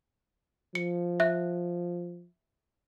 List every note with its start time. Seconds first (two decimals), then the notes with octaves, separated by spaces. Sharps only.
0.75 F3 C#7
1.20 E5 F#6